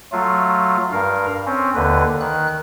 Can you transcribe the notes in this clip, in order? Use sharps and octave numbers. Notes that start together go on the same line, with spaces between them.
F#3 A3 F4
G2 A#4 F5
C4 C#4
D#2 D3 B4
D#3 F#6